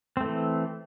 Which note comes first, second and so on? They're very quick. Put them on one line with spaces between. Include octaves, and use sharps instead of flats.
C4 A3 E3